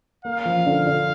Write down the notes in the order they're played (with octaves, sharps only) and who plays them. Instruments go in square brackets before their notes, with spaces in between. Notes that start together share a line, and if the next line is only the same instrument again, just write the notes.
[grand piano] A#3 [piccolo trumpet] F5
[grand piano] F3
D3
D3